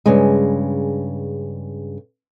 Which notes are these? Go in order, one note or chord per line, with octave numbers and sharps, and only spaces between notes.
G2 C#3 G#3